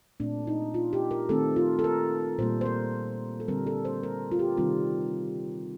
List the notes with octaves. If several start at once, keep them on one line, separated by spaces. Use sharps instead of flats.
A#2 A3 C4 D4
D#4
F4
G4
A#4
D#3 A3 C4 A4
F4
A4
A#4
A#2 G3 A#3 C5
C5
A#4
A4
D3 G3 C4 A#4
A4
C5
A#4
F4
G4
C3 D#3 G3 C4 F4